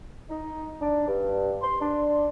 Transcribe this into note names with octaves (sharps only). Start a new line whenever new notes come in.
D#4
D4
G2
C6
D4